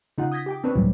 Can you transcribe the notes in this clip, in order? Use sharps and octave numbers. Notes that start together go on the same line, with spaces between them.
C#3 D#4 F4 F#5
D#6 G6 G#6 A#6 B6
G4 G5 D6
C4 D4 B4 C#5
C#2 A2 C3 E3 F#3 G3